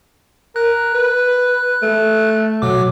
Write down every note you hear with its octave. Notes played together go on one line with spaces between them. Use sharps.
A#4 F#6
B4
A3
B2 F#3 D6